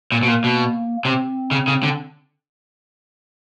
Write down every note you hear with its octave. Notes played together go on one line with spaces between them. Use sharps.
A#2 A#3
B2
A#2
B2
C3 C4
C#3
C#3
D3